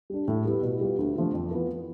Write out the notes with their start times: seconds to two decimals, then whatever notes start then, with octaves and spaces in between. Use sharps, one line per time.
0.10 G3 D4
0.28 A2
0.45 G3 B3 E4 G4
0.63 B2
0.81 G3 B3 F4
0.99 D2
1.16 D3 F3 A3
1.34 F2
1.51 E3 B3 F4